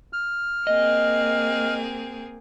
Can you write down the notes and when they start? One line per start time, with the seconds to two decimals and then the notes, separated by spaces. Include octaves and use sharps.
0.13 F6
0.67 A#3 C4 G#4 D#5